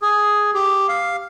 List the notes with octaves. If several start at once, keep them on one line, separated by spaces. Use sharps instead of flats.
G#4
G4
F5